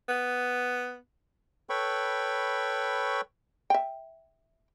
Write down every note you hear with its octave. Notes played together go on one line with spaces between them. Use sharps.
B3
A4 B4 C#5 G5 B5 C#6
E5 G5